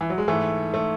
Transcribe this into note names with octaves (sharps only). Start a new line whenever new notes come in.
E3
F#3
G#3
G#2 E3 A3
A3